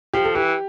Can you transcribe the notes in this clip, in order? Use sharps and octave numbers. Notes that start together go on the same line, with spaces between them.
F3 G4
A4
E3 G4